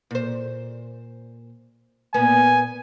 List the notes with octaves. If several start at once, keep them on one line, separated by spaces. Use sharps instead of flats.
A#2 C5
A#2 B3 G#5